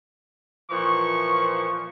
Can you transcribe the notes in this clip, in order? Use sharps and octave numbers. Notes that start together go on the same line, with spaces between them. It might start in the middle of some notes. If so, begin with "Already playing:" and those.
A#2 E3 F3 C#6